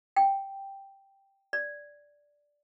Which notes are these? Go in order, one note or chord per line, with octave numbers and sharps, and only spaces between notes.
G5
D5